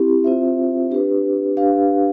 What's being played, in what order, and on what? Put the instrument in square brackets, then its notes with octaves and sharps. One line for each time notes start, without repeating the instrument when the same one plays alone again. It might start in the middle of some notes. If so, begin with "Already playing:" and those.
Already playing: [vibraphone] C4 E4 G4
C4 F4 C5 E5
D4 G4 B4
D4 G4 B4 F5